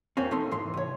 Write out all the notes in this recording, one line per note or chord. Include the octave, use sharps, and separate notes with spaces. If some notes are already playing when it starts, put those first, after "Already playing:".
E2 A#2 A#3 C4 C#4
A3 D#4 A4 C6
G#2 E3 C6
C2 C#5